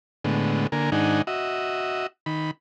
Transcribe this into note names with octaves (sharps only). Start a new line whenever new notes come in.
A2 D3 G#3 B3
D3 A#3 A#4 G#5
G#2 D#3 D4 D#4 F#5 G#5
F#4 D#5 E5
D#3 B5